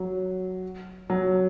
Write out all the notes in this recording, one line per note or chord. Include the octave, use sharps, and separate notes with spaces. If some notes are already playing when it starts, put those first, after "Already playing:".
Already playing: F#3
F#3